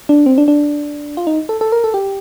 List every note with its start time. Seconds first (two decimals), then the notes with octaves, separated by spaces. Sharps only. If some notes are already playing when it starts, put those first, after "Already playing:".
0.09 D4
0.26 C4
0.38 D4
0.48 D4
1.17 F4
1.27 D#4
1.49 A4
1.61 A4
1.72 A#4
1.84 A4
1.94 G4